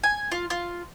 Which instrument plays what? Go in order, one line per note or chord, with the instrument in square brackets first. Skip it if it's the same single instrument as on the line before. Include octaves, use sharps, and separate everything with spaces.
[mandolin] G#5
F4
F4